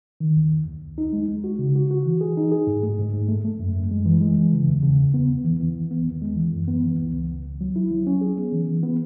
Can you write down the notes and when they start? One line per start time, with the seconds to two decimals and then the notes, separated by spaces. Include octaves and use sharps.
0.20 D#3
0.36 D#2
0.52 D#2
0.67 D#2
0.82 C#2
0.98 D#4
1.13 G#3
1.28 G#3
1.44 F#4
1.59 C#3
1.76 F#4
1.91 F#4
2.05 E3
2.21 G#4
2.37 D#4
2.52 G#4
2.67 G#2
2.83 A3
2.99 G#2
3.13 G#2
3.28 A3
3.45 A3
3.59 F#2
3.76 F#2
3.91 G#3
4.06 E3
4.21 G#3
4.37 E3
4.52 C#3
4.68 E2
4.83 C#3
4.98 E2
5.14 B3
5.29 E2
5.44 E3
5.60 E3
5.75 D#2
5.91 B3
6.07 D#2
6.22 G#3
6.36 E3
6.52 F#2
6.68 B3
6.84 E3
6.99 C#2
7.14 C#2
7.29 C#2
7.45 C#2
7.61 F#3
7.76 E4
7.91 F#3
8.07 C#4
8.21 G#4
8.38 B3
8.53 E3
8.68 E3
8.83 B3